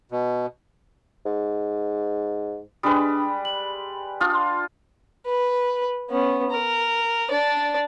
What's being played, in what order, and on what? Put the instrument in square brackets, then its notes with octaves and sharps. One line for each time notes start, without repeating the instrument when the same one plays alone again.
[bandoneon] B2
[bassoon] G#2
[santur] G3 G#3 B4 [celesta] D4 D#6
[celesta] F#7
[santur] D4 F4 [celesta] D#6 F6
[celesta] C6
[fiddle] B4
B3 C#4
A#4
D4 D5